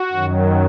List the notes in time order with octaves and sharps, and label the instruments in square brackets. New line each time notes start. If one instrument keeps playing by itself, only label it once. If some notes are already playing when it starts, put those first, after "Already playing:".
Already playing: [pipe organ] F#4
F#2 D#3 F#3